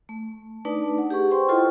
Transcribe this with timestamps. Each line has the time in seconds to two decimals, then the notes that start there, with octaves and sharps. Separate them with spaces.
0.09 A3
0.65 A3 D4 D#4 B4 D5 A5
0.98 F#5
1.10 G4 G#4 C#6
1.31 B4 C5 G5 C6 C#6
1.49 E4 F4 A4 C5 D#5 G5